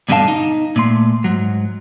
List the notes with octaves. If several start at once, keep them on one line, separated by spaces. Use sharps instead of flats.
D2 G2 B2 D3 F5 A5
D#4
A#2 A3 C6
G#2 F#3